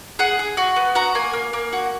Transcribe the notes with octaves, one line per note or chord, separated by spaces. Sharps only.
G#4 F#5
G#4
F#4
B3
F#4 A#5
A#3 G#5
A#3
A#3
F#4